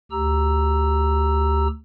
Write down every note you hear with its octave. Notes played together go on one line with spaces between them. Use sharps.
D2 G4 A#5 E6